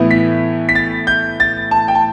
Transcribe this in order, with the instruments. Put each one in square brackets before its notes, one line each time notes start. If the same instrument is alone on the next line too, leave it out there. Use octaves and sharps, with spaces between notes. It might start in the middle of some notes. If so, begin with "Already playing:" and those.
Already playing: [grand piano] A2 E3 B3 E4
B6
B6
A6
G6
A6
A5
G5
A5